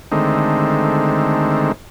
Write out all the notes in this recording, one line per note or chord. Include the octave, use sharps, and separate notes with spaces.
D3 D#3 G#3 A3 C4 D#4